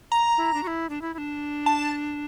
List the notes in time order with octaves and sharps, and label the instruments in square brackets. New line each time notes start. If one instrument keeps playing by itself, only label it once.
[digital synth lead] A#5
[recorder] E4
D4
F#4
E4
D4
E4
E4
D4
[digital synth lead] A5